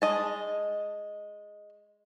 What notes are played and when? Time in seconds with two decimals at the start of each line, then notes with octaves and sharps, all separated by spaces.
0.02 G#3 D#5 A5